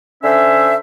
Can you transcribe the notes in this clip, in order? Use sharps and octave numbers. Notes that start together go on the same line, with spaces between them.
D3 C#4 C5 E5